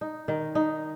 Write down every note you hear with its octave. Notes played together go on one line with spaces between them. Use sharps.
D#4
D#3
D#4